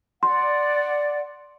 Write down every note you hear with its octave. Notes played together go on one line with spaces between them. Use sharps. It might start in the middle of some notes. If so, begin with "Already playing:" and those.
D5 F#5 C6